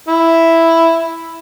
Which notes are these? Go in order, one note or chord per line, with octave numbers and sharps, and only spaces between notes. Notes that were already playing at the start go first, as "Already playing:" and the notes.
E4